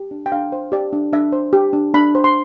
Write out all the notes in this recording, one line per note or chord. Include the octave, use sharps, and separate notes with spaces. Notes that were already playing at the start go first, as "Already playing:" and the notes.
Already playing: G4
D4
G5
D4 F5
C5
G4 D5
D4
D4 E5
C5
G4
D4
D4 B5
C5
C6